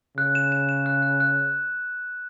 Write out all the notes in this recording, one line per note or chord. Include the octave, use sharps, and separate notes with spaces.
C#3 F#6
E7
E7
E7
F#6
F#6
F#6